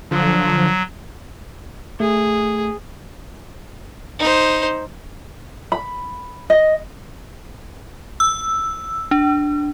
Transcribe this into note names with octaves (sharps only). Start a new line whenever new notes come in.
D3 F3 F#3
A3 G#4
D#4 C5
B5
D#5
E6
D4